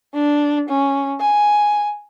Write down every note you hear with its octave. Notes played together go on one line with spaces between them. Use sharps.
D4
C#4
G#5